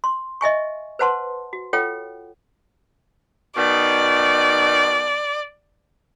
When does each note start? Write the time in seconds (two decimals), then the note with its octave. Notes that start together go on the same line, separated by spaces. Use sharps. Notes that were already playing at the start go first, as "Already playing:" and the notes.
0.04 C6
0.41 D#5 E5 G#5 C#6
0.99 B4 C5 F#5 A5 C6
1.53 F#4
1.73 F4 A4 C#5 F#5 G5
3.56 B2 D#3 D#4 D5